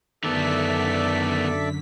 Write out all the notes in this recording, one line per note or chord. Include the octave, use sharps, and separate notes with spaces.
F#2 D3 D#3 B3 A4 D5 E5 B6